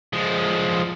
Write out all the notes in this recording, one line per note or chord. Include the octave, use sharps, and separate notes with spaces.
F3 G#3